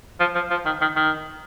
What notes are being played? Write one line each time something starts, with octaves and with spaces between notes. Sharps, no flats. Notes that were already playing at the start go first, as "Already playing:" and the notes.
F3
F3
F3
D#3
D#3
D#3